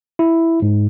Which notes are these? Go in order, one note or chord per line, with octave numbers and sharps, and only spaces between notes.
E4
G#2